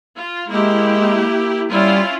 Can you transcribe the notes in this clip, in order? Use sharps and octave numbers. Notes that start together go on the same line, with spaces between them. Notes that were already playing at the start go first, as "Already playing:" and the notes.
F4
G#3 A#3 E4 G4
G3 C#4 E4 F4